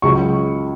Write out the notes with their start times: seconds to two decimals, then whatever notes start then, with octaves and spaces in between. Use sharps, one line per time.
0.02 C#2 C#3 F#3 C#6